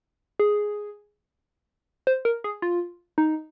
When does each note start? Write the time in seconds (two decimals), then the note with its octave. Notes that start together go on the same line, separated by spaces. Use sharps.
0.39 G#4
2.07 C5
2.25 A#4
2.44 G#4
2.62 F4
3.18 D#4